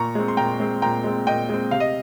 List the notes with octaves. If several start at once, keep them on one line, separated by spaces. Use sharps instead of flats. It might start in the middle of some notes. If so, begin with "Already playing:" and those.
Already playing: A#2 A#5 C#6
G#3 C4
C6
A#2 G5 A#5
G#3 C4
A#2 G5 A#5
G#3 C4
A#2 D#5 G5
G#3 C4
C3 F5
D#5